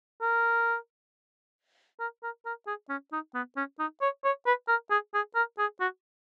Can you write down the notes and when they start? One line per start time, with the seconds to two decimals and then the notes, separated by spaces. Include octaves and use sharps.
0.21 A#4
2.00 A#4
2.23 A#4
2.46 A#4
2.67 G#4
2.89 C#4
3.12 D#4
3.35 B3
3.57 C#4
3.79 D#4
4.02 C#5
4.25 C#5
4.46 B4
4.68 A#4
4.90 G#4
5.14 G#4
5.35 A#4
5.58 G#4
5.81 F#4